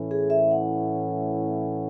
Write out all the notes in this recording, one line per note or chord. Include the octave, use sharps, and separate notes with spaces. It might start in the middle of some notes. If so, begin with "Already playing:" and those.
Already playing: A2 E3 A3 C#4 E4
G#4
E5
F#5